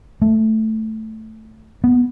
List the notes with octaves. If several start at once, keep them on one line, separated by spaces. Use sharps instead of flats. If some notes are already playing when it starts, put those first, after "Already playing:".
A3
B3